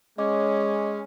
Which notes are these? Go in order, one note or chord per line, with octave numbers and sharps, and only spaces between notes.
G#3 C#4 D#5 D6